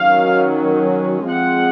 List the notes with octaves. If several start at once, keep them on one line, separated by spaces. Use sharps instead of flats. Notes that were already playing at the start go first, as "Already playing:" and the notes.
Already playing: D#3 F#3 C#4 F5
F3 G#3 C4 F#5